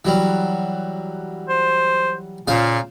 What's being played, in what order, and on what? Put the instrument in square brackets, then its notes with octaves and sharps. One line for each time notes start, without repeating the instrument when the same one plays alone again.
[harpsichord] E3 F#3 G3
[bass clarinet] C5
[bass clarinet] A#2 [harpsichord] C#3 F4 C5